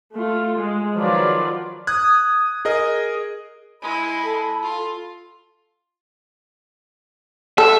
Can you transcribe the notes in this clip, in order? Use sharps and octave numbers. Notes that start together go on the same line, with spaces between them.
A3 F4
G#3
D#3 F3 F#3 F4 B4 D5
D#6 F#6 G#6
G#4 A#4 D#5
G#3 E4 B5
A4
F4
A4 E5